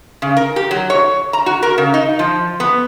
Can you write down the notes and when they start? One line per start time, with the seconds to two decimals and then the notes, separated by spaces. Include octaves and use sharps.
0.22 C#3
0.37 A#4
0.56 G4
0.71 F#3
0.90 C#5
1.33 A#5
1.46 F#4
1.63 A#4
1.78 C#3
1.94 D#4
2.19 F3
2.60 B3